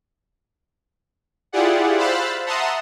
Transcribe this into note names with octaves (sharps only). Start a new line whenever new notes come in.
E4 F4 G4 G#4 D5 F#5
C5 F5 B5 E6 F#6 A6
E5 F#5 A5 A#5 C6 D#6